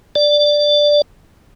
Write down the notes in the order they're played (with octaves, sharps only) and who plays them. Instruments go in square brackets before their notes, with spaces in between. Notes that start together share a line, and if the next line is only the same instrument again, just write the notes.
[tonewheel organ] D5